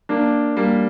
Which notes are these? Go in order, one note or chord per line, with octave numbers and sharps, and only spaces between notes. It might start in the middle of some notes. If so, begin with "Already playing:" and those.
A#3 D4
G3 A#3